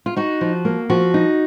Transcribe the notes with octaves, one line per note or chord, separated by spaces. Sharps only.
F4
D#4 F#4
F3
A#3
F3 F#4
D#4